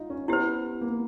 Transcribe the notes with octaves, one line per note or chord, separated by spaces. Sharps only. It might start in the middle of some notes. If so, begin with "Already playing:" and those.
Already playing: D#4 F4
C#4
B3 E4 G4 C5
A#3